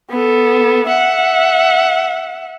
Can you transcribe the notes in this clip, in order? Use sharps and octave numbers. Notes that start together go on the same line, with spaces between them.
B3 A4
E5 F#5